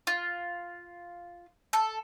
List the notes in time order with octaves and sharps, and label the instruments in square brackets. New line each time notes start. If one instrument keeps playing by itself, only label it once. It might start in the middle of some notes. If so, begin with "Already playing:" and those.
[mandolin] F4
A4